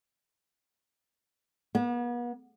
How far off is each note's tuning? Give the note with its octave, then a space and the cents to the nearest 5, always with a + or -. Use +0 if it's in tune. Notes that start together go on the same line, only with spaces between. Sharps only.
B3 -40